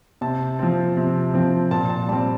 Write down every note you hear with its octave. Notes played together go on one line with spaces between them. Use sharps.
C3 A5
F3 C4
C3
F3 C4
A#2 A5
A5
G3 C4 A5